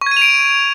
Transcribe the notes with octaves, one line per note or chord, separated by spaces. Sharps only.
C#6
G#6
D#7
F7
D7